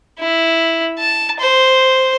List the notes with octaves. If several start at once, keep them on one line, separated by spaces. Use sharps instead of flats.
E4
A5
C5